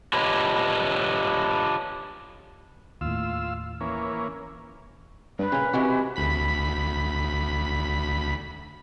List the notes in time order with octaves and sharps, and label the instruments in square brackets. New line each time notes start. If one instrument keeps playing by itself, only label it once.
[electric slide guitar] D4 F4 G4 B4 C#5 D#5
[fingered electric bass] D#2 A2 [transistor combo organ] F4 E6
[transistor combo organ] E3 A#3 C#4
[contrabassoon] G2 [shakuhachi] B4
[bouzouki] A#2 F5 [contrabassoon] C#3
[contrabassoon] C3 [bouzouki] E3 G#3 F#4
[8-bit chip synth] D2 B5 B6